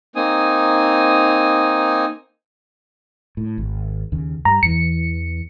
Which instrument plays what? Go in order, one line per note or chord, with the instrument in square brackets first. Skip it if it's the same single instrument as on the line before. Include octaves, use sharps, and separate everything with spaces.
[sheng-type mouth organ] A#3 C4 D#4 G#5 D#6
[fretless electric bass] A2
G#1
D#2 C#3
[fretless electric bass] G2 G3 [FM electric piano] A#5
[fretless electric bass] E2 E3 [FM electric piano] C#7